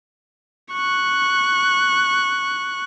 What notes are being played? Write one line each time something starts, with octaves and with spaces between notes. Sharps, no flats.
C#6 F#6